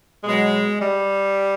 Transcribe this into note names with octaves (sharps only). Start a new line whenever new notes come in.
B2 F#3 G#3
G3